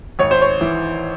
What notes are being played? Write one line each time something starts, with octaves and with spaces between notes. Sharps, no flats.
G#1 C#5
C5
C#5
E3